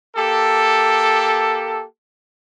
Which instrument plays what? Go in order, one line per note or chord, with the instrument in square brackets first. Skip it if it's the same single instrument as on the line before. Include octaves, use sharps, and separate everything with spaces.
[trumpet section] A#3 G4 A4